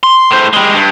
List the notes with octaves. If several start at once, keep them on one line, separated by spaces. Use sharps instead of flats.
C6
A2 C5
G3 G#3
G2